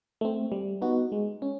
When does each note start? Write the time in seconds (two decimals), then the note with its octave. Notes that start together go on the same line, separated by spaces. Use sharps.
0.21 A3 C4
0.52 G3
0.82 B3 D#4 F#4
1.12 G#3
1.42 C#4